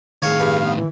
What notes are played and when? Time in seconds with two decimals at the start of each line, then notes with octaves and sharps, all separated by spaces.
0.22 A2 D#3 G#4 C#5 F5
0.40 G2
0.61 B3
0.75 E3